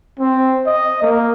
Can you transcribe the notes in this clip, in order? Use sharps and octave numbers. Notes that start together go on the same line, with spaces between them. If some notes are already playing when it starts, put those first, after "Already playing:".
C4
D#5
A#3